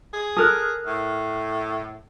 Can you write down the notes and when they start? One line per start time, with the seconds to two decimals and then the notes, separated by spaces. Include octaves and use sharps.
0.13 G#4
0.37 A4 A#4 D#6 F6 F#6
0.86 A2